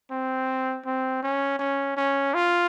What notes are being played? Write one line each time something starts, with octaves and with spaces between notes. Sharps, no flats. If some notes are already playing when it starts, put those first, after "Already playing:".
C4
C4
C#4
C#4
C#4
F4